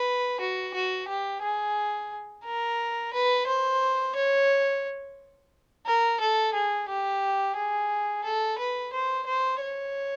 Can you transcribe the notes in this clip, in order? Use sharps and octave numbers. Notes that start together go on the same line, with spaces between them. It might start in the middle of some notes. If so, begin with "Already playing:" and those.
Already playing: B4
F#4
F#4
G4
G#4
A#4
B4
C5
C#5
A#4
A4
G#4
G4
G#4
A4
B4
C5
C5
C#5